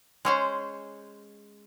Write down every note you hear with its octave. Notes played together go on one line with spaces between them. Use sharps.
G#3 C#4 C5